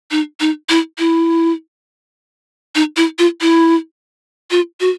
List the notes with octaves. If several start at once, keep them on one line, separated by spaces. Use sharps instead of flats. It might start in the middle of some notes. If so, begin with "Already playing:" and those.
D#4
D#4
E4
E4
D#4
E4
F4
E4
F4
F#4